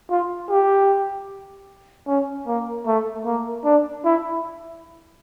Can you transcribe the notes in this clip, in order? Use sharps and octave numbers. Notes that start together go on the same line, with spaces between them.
F4
G4
C#4
A#3
A3
A#3
D4
E4